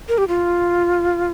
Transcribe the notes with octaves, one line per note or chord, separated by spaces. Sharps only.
A#4
G4
F4